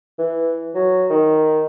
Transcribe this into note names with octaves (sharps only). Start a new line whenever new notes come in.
E3
F#3
D#3